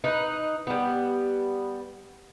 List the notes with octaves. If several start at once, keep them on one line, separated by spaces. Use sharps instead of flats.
D#4 B4
G3 B3